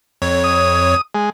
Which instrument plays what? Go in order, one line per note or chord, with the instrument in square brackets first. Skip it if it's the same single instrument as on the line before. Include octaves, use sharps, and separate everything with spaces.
[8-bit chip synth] F2 C#5
[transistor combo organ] D#6
G#3